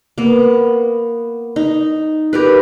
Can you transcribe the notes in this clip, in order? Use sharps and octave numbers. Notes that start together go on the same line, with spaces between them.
A#3 B3
D#4
G4 A#4 B4